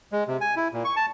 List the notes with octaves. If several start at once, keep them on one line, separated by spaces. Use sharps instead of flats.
G#3
C3
G#5
E4
A#2
C#6
A5